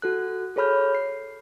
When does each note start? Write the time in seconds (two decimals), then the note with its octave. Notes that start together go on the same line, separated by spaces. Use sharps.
0.02 F#4 A4 F#6
0.56 G#4 A4 C#5 B5 F6 G6
0.95 C7